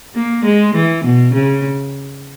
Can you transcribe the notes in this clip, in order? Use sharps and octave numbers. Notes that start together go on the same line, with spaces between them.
A#3
G#3
E3
B2
C#3